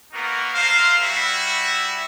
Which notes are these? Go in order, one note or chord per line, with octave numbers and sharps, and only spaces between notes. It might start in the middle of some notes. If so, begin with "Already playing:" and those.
A#3 B3 D#4 F#4 A#4
A3 A#4 C5 F5
G3 E4 F#4 E5